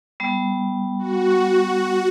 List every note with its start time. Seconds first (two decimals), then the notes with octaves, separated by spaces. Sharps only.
0.20 G3 B3
0.99 F#4